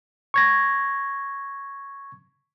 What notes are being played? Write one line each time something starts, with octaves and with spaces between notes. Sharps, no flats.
C#6 G#6 A#6